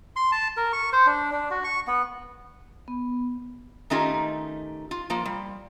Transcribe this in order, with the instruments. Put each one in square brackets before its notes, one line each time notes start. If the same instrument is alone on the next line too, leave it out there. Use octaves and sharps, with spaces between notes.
[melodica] C6
A5
A#4
C#6
C5
D4
D4
F#4
C#6
B3
[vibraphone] B3
[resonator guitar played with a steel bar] D#3 A3 C#4 D#4 F4 G4
F4
F3 A#3 F4
G3